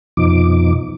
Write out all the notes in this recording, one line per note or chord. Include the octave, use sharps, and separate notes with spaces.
F2 B2 F3 D#4 D6